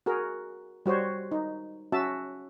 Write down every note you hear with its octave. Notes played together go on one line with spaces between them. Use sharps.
F#4 G#4 A#4
G3 F#4 C5 C#5
D#4
C#4 F#4 E5 A5